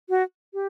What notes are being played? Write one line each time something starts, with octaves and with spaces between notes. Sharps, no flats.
F#4
G4